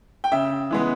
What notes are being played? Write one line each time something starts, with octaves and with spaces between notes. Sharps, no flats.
G5
C#3 E5
E3 G#3 B3